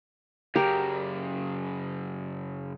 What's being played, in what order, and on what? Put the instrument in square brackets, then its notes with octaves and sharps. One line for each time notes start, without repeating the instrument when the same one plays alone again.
[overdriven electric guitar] F#2 C#3 [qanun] G4 A#4